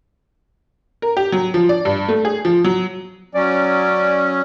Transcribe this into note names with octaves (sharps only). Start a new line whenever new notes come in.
A#4
G4
F#3
F3
D5
G2
A3
G#4
F3
F#3
F#3 C#4 D5